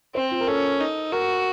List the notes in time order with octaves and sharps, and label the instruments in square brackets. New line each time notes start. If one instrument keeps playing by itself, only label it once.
[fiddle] C4 [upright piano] C5
[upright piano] F4
A#4
[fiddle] C#4 [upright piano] A4
[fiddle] D#4
[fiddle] F#4 [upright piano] A#4